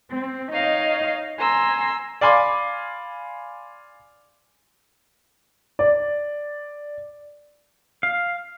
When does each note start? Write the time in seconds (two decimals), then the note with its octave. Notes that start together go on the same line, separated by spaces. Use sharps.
0.11 C4
0.52 D#4 C#5 D#5 F5
1.39 G#5 A#5 C6 E6
2.21 D5 F5 G#5 B5 C6 D6
5.79 D5
8.03 F5